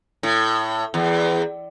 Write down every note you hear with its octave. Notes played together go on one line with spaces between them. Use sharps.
A2
E2